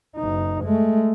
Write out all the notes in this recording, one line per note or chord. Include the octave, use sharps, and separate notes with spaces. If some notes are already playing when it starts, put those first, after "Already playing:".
F#1 D#4
G#3 A3